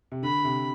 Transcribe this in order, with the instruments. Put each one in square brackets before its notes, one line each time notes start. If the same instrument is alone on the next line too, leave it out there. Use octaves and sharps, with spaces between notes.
[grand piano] C3
[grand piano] D3 [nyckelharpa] B5
[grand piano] C3